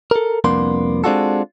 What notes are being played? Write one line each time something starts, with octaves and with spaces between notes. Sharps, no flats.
A4 A#4
C2 F2 A#3 B3 D4 C6
G#3 C4 D4 F4 F#4 A4